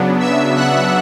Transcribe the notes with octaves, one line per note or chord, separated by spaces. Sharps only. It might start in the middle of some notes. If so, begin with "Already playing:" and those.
Already playing: C#3 F#3 B3 D4
E5 E6
F#5 F#6